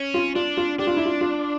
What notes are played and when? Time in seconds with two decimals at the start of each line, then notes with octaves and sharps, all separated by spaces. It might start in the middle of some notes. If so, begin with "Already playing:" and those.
Already playing: C#4
0.14 F4
0.35 D4 F4
0.57 F4
0.79 D4 G4
0.87 F4
0.96 E4
1.06 F4
1.21 F4